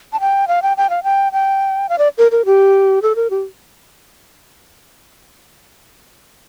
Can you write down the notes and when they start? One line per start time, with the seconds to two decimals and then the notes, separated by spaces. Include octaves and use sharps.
0.13 A5
0.20 G5
0.48 F5
0.62 G5
0.77 G5
0.90 F5
1.04 G5
1.32 G5
1.89 F5
1.98 D5
2.18 A#4
2.32 A#4
2.46 G4
3.02 A4
3.16 A#4
3.30 G4